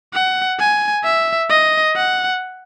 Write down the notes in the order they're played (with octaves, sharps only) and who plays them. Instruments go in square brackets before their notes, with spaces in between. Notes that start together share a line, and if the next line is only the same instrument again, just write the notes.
[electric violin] F#5
G#5
E5
D#5
F#5